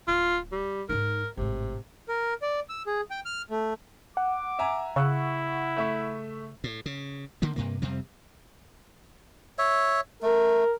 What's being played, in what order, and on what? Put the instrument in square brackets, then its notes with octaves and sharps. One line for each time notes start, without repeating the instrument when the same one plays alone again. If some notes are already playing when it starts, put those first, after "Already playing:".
[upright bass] D1 [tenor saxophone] F4
[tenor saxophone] G3
[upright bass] G#2 D#4 [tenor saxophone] A#4
[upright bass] G#1 A2 [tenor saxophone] C3
[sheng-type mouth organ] A#4
D5
E6
G#4
G5
F6
A3
[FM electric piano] F#5 [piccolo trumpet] D6
[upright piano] E5 G#5 A#5
[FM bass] C#3 [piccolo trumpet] E4 [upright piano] C#6 E6 F#6
[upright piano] A3 E5 C#6
[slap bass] A2
C#3
D3 D#3 A#3
G2 C3 A#3
F2 C3 G3 C4
[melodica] C#5 E5
[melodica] A3 [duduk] A#4